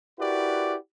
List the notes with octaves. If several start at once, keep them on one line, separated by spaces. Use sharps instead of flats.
E4 F#4 G4 A#4 B4 D5